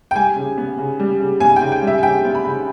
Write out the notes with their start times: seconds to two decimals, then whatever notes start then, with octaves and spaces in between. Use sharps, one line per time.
0.11 G5
0.15 G3 G#5
0.36 C#3
0.57 B3
0.78 C#3
1.00 G3
1.20 C#3
1.40 B3 G#5
1.56 G5
1.62 C#3
1.72 G5
1.82 G3 E5
1.98 G#5
2.03 C#3 G5
2.24 B3
2.35 B5
2.44 C#3